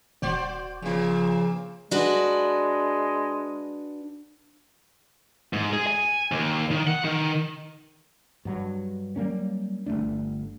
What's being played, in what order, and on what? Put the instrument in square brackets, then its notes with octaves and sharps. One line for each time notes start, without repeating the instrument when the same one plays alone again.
[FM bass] D#1 [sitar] F#4 C5 D5
[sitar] A#2 A#3 [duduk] C#3 [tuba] F3
[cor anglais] G#3 [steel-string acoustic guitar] D4 F#4 B4
[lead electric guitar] G#2
G#4
G#5
D#2
D#3
F#5
D#3
[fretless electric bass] G2 F#3
F#3 G3 A#3 C#4
G1 F#2 A3 D4